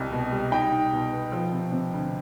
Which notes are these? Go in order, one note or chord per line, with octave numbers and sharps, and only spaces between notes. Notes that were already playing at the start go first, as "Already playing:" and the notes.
Already playing: C2 C3 G3 D#5
B2
G3
D#4 G5
D#4
B2
B3
F3
C3
C3
D2